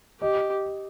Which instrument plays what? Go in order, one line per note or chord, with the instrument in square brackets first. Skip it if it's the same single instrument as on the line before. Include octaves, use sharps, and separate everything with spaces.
[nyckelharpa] G4 [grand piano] D#5